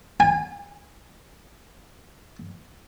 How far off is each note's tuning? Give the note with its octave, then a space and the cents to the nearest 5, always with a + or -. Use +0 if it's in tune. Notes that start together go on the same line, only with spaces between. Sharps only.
G#5 -40